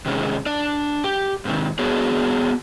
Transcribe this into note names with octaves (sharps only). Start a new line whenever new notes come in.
C3 D#3 G#3 C#4
D4 D5
G4
G#2 C3 D#3
B3 D4 F#4 G#4 C#5